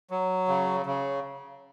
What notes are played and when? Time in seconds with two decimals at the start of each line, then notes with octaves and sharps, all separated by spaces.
0.10 F#3
0.48 C#3
0.86 C#3